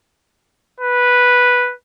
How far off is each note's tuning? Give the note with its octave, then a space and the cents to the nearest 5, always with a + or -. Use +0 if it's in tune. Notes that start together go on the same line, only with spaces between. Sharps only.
B4 -5